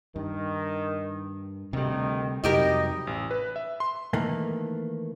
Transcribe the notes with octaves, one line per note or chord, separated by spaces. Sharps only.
G2 D#3
D2 C3 D#3 G3
F2 C3 F#3 G3 D#4 G4 A#4 D#5
A1
B4
E5
C6
D#3 E3 A3 A#3